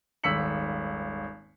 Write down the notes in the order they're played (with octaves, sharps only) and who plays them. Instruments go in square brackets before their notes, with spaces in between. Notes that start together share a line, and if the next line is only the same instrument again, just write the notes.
[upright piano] D#1 G#1 E6 B6 C#7 F#7